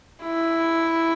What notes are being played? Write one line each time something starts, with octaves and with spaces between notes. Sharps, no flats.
E4